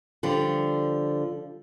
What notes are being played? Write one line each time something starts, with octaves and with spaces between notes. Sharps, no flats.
D3 F3 G3